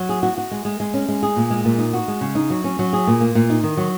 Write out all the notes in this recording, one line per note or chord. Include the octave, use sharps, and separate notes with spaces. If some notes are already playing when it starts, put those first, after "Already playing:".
Already playing: F#3
G#4
F#4
F#4
G#3
G#3
G#3
C#4
G#3
G#4
A#2
G#3
A#2
D#4
F#4
G#3
C#3
D#4
F#3
C#4
F#3
G#4
A#2
A#3
A#2
D#4
D#3
F#3